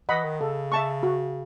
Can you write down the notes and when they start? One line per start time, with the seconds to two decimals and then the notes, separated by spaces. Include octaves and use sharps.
0.09 E3 D#5 F#5 B5
0.24 D#3
0.40 C#3 A4
0.72 E5 A5 C#6
1.03 F#4